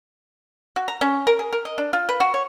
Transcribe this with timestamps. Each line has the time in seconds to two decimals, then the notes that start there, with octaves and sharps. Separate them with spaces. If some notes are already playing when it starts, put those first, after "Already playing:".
0.76 F#4
0.88 A#5
1.01 C#4
1.27 A#4
1.39 G#4
1.53 A#4
1.65 D#5
1.78 D4
1.93 F4
2.09 B4
2.20 F#4
2.34 C#5